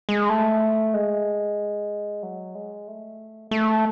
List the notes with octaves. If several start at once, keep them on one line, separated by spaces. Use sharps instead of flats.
G#3
A3
G#3
F#3
G#3
A3
A3